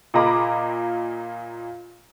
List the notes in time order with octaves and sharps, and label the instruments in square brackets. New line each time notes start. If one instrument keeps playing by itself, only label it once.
[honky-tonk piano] A#2 A#3 D#5 A#5 B5 D6